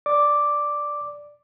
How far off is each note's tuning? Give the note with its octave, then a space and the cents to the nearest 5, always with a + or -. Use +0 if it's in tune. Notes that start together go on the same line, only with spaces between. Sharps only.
D5 +0 D6 +0